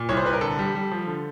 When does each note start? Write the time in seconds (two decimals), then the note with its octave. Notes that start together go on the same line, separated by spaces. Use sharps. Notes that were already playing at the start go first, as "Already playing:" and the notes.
Already playing: A#2
0.09 C2 C#5
0.17 C5
0.25 C2 B4
0.33 A#4
0.41 D3 A4
0.59 G3
0.75 G3
0.91 F3
1.07 D3